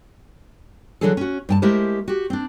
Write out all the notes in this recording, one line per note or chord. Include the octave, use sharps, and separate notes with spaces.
D3 E3 F#3 D4 G#4 A4
C#4 F#4
G2 G5 A5
G#3 A3 E4 G4 A#4 C5
F#4 G4
C4 D4